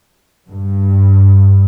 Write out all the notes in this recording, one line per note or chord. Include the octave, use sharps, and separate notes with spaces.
G2